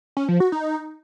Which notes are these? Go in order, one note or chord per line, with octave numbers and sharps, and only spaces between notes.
C#4
F3
F#4
D#4